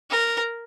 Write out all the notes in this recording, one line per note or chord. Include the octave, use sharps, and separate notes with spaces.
A#4